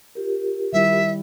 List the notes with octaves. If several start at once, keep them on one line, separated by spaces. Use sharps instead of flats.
F4 G4 A#4
D#3 G3 E4 E5